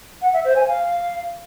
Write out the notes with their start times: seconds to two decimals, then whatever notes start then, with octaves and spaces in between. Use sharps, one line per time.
0.22 F#5
0.33 E5
0.45 C5
0.56 G#5
0.68 F5